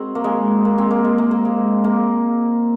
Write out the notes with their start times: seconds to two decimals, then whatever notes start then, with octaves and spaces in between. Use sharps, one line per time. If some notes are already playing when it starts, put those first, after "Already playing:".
Already playing: C4 F#4 G#4 A#4 D#5
0.15 A#3
0.24 G#3
0.65 A#3
0.78 G#3 C4
0.91 A#3
1.05 G#3
1.18 A#3
1.31 A#3
1.45 G#3
1.84 A#3